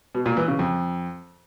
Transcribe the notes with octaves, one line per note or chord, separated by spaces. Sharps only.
B2
A#2
E3
C#3
F2